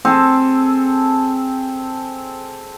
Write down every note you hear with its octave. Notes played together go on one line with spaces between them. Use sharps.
C4 G#4 A4